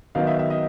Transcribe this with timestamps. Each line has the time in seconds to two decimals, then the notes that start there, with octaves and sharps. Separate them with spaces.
0.15 D#3 F#3 B3 D#4 F5
0.27 E5
0.39 E5
0.50 D#5